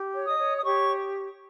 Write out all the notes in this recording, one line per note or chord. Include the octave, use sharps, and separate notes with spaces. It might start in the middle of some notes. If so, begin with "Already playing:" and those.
Already playing: G4
C#5
D#5 D#6
C#5
D#6
G4 C#5 C#6